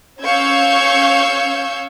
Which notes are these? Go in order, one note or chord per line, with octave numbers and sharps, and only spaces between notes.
C#4 F5 C#6 E6 G6 G#6